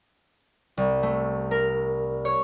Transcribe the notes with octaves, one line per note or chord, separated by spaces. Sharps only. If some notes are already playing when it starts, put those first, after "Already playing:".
C2
A3
A#4
C#5